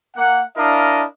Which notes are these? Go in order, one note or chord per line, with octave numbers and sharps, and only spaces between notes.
A#3 F#5
D4 E4 A#4 D#5 F5